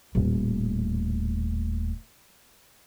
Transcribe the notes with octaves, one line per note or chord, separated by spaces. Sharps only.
D#1 A2